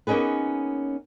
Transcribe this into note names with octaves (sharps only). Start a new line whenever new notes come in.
A#3 B3 C#4 D#4 G#4 B4